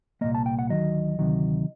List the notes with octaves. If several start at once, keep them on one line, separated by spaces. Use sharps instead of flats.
C2 A#2 F#3 A#3 D#5
A5
G5
F#5
D2 C3 D#3 F#3 D#5
D2 C3 D#3 F#3